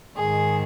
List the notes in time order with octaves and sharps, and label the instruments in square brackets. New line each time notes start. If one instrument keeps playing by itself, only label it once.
[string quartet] G#2 D#3 G#4